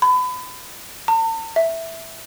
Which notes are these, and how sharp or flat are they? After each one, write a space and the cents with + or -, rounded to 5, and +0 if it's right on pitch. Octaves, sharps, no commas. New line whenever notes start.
B5 +30
A5 +45
E5 -5